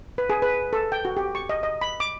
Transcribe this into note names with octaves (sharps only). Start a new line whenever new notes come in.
B4
G#4
B4
A4
G5
F#4
G4
C#6
D#5
D#5
B5
D6